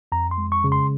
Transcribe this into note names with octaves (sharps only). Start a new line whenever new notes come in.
F2 A#5
C6
G#3
C#6
C#3
C6